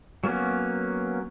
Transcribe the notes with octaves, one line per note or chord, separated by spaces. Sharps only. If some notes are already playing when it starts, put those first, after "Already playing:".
F#3 A#3 B3 C#4